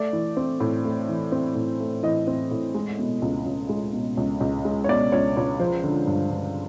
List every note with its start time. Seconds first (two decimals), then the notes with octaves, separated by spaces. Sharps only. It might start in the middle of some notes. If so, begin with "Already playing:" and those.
Already playing: A3 D5
0.13 E3
0.37 C4
0.60 A2
0.85 A3
1.09 E3
1.32 C4
1.55 A2
1.80 A3
2.03 E3 D#5
2.27 C4
2.51 A2
2.75 G#3
2.99 B2
3.22 C#2
3.46 C#2
3.69 G#3
3.93 B2
4.17 C#2
4.40 C#2
4.65 G#3
4.84 C#5
4.88 B2 D5
5.12 C#2 C#5
5.37 C#2 C#5
5.59 F3 C5
5.84 D3
6.07 G2
6.31 G2